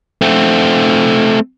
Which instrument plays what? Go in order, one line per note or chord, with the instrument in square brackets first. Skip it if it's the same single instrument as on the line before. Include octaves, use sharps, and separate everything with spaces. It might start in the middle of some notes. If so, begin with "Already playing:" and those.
[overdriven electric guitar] A3 C4